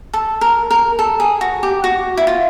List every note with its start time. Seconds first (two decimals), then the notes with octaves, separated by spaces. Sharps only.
0.14 A4
0.41 A#4
0.71 A#4
0.99 A4
1.20 G#4
1.41 F#4
1.63 G4
1.84 F#4
2.17 E4
2.27 F4